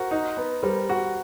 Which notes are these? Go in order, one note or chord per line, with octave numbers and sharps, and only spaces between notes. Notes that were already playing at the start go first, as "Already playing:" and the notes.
Already playing: F#4 A#4 C5
D#4
B3
G3 A#4 C5
F#4